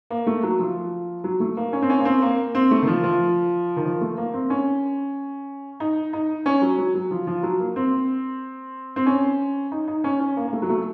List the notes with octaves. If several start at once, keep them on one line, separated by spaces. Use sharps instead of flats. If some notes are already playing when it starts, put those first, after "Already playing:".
A#3
A3
F#3
F3
F#3
A3
A#3
C#4
C4
C#4
A#3
C4
A#3
C4
A3
D#3
F3
F3
D#3
F3
A3
A#3
C4
C#4
D#4
D#4
C#4
F#3
F#3
F#3
F3
F3
F#3
A#3
C4
C4
C#4
D#4
D#4
C#4
C#4
A#3
A#3
A3
F#3
A3